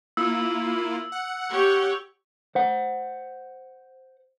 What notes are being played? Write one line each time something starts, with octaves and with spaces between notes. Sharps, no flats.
A#3 E4 F4 E6
F#5
G4 C#5
C5 F#5